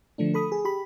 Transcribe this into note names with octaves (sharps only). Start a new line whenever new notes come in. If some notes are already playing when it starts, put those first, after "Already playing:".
D3 F3 A3 D4
A4 B5 D#6
G#4
G4 B5